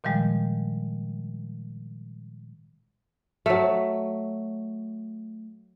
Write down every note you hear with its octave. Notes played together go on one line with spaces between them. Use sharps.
A#2 D#3 F3 G3 G#3
F#3 A3